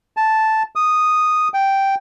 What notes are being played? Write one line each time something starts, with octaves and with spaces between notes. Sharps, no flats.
A5
D#6
G5